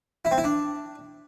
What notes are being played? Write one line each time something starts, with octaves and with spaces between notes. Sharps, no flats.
E4
C4
E4
D4